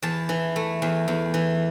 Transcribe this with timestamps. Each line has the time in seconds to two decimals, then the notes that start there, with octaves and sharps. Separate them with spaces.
0.02 E2 A5
0.29 E3
0.56 A3
0.82 E2
1.08 E2
1.34 E3